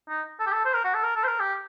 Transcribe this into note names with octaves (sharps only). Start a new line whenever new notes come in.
D#4
A4
G4
A4
C5
A#4
F#4
A4
A#4
A4
C5
A#4
G4